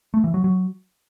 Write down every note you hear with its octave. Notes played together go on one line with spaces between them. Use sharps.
A3
E3
F#3
F#3